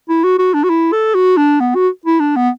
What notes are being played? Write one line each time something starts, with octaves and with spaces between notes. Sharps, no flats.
E4
F#4
F#4
D4
F#4
E4
A4
F#4
D4
B3
F#4
E4
D4
B3